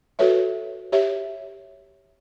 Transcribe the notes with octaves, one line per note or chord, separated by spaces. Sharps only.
F#4 A4 B4 C#5 E5
G4 C#5 E5